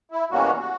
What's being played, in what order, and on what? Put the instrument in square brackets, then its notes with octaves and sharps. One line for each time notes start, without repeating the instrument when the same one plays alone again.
[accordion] E4
E2 B2 G3 A#3 C#4 F#4
F#4